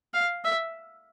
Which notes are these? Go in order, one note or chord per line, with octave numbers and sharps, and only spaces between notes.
F5
E5